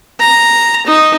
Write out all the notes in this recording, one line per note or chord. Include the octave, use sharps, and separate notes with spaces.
A#5
D#4